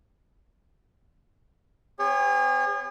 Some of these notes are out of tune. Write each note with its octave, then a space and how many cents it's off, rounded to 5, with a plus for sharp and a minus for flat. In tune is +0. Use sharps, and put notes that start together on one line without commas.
C4 -45 G#4 -40 C#5 +0